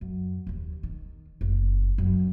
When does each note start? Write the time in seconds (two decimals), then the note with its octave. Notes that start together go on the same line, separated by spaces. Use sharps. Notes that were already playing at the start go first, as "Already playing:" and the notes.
0.01 F#2
0.47 D#2 D#3
0.83 D#3
1.41 F#1
1.98 F#2